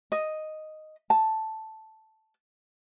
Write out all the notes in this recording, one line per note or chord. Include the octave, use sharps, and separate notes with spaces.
D#5
A5